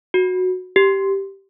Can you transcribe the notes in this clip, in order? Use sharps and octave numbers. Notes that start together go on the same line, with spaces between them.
F#4
G4